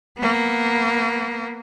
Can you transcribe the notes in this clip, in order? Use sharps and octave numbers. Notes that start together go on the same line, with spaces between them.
A#3 B3